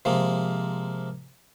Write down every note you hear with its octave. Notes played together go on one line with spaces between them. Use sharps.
C3 F3 G#3 A#3